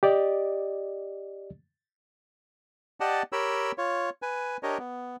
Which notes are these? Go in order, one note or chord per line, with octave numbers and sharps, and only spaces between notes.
G4 D5 D#5
G4 D5 D#5 F#5 A5
G4 A#4 C#5 G5 B5 E6
F4 C#5
B4 G#5
D4 G4 A#4 C#5 D#5
B3